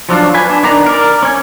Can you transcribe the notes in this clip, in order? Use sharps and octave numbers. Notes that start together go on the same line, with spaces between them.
F3 F#3 D4 F4
B4 G#5
D4
D#3 B3 D4 A#5
A#4 D5
C#4 G#5